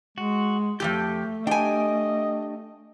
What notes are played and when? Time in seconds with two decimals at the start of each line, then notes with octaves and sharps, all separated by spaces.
0.18 G#3 F#4
0.80 F2 E3 A3 G4 G6
1.47 D4 G4 D#5 G5 G#5